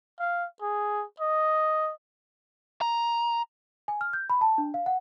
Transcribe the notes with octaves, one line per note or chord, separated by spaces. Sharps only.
F5
G#4
D#5
A#5
G#5
F6
G6
B5
A5
D4
F5
F#5